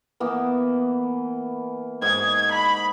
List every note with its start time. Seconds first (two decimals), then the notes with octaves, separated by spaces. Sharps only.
0.20 E3 A#3 B3
2.02 G#2 G#4 G#6
2.52 B5